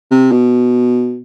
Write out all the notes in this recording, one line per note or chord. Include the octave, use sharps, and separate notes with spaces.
C3
B2